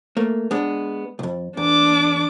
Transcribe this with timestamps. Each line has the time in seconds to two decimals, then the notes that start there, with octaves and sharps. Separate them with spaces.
0.17 A3 A#3
0.51 G#3 B3 D4
1.19 B1 F2
1.57 E2 D4 D6